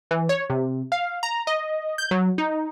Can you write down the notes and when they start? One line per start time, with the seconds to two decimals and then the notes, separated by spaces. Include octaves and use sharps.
0.11 E3
0.29 C#5
0.50 C3
0.92 F5
1.23 A#5
1.47 D#5
1.98 G6
2.11 F#3
2.38 D#4